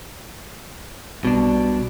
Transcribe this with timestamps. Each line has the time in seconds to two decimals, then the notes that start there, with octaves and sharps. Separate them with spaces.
1.25 B1 B2 G3 B3 D4